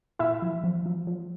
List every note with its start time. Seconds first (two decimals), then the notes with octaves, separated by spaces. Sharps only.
0.19 A#2 E4 E5
0.42 F3
0.64 F3
0.86 F3
1.07 F3